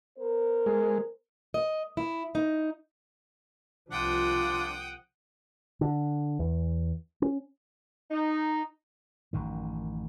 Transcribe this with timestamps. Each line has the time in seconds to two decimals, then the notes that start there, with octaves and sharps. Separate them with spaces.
0.18 B3 A#4 C5
0.66 G#3
1.54 D#5
1.97 E4
2.35 D#4
3.90 C2 F3 D4 F4 F#5 G5 D#6
5.81 D3
6.39 E2
7.22 C#4
8.10 D#4
9.33 A1 F#2 D#3